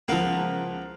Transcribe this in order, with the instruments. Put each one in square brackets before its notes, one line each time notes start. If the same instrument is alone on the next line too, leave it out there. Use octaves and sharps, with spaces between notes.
[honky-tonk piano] C#2 F3 [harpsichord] A#3 B3 A#4